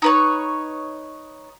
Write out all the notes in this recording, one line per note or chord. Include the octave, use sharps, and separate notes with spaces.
D#4 B4 C#5